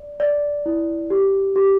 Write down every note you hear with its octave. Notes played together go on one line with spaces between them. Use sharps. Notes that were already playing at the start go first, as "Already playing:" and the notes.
Already playing: D5
D5
E4
G4
G4